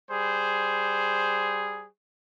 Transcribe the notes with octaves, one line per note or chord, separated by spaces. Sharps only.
G3 G#4 C5